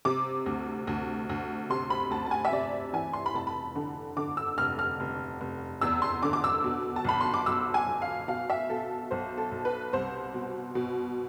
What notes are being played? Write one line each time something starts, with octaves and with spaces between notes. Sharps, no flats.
C3 D6
D2
D2
D2
C3 C6
B5
D2 A5
A5
G#5
E5
C3 D5
E3 G#5
C6
B5
F1 A5
B5
D3
D3 D6
E6
F1 F6
F6
F1
F1
E2 E6
C6
D3 D6
D6
E6
B2
A5
B1 B5
C6
D6
B1 E6
G#5
B1
F5
B2 F5
E5
B2 A4
B1 C5
A4
B1
B4
C2 C5
B2
B2